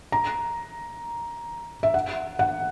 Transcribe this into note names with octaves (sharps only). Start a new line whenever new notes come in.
A#5
E5
F#5
F#5